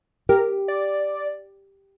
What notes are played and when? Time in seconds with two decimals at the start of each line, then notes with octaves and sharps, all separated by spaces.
0.29 G4 A#4
0.68 D5